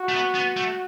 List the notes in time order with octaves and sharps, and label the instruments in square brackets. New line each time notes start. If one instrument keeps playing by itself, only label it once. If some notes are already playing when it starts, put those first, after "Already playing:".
Already playing: [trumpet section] F#4
[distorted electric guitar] A3
B3
B3
A3